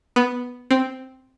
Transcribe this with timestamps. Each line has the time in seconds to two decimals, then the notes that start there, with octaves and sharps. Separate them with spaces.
0.16 B3
0.71 C4